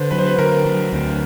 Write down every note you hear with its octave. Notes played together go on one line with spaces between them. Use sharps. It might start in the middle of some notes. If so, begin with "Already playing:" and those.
Already playing: D3 B4 C5
F#3 B4
C5
B4
D3 A#4
F#3
D2